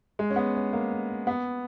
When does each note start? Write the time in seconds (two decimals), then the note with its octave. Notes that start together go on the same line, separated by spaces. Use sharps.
0.19 G#3
0.30 C#4
0.36 B3
0.55 C#4
0.73 A#3
1.27 B3